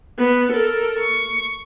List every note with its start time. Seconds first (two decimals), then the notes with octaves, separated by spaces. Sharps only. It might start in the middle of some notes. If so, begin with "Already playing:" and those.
0.18 B3
0.52 A4 A#4
0.99 C#6